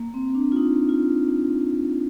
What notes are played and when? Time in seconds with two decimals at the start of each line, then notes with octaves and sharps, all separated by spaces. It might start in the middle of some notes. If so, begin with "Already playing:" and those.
Already playing: A#3
0.14 C4
0.30 C4
0.35 D4
0.52 F4
0.56 D#4
0.89 F4